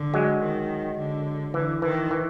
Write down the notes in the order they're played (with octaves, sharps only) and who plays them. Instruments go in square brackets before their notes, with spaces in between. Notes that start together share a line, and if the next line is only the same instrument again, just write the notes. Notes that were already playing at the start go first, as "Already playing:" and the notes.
Already playing: [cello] D3
[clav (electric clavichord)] F#3 G#3
[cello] D#3
D3
[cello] D3 [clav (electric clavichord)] E3
[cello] D#3 [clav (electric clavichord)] E3
[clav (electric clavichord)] E3